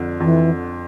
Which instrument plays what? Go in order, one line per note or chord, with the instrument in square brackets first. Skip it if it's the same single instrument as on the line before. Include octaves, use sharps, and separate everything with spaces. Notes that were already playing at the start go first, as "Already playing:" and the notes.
Already playing: [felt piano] F2 D3
[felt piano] F2 [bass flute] E3